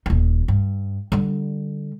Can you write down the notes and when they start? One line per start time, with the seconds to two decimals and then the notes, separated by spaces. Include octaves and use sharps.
0.06 D#1 D#4
0.48 G2
1.12 D3 G3